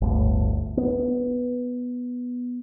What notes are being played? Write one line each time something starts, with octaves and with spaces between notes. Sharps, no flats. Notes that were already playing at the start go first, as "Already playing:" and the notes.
G1 D2 A2
B3